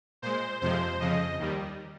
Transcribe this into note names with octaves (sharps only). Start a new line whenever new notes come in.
A#2 G#3 C5
F2 C3 F3 G#3 C5
F2 C#3 F3 D#5
D#2 D#3 G3